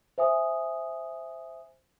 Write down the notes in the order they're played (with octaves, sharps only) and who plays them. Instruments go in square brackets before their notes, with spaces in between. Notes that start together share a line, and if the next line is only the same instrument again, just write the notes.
[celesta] C5 E5 G#5 D#6